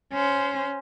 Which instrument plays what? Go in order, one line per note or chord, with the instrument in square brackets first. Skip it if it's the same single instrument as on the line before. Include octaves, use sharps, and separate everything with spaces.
[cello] C#4 C5